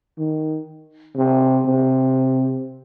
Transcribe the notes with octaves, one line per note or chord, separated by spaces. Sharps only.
D#3
C3
C3